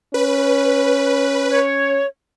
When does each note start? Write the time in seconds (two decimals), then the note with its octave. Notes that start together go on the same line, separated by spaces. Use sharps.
0.14 C#4 B4
1.48 C#5